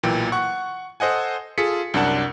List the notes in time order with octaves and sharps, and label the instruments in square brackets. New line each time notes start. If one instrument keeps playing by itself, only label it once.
[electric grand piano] B1 A#2 E3 G5
F#5 C#6
A4 C5 D#5 F#5 G#5
F4 G#4 A4 B6 C#7
C2 F#2 D4 A#4 F#5 A5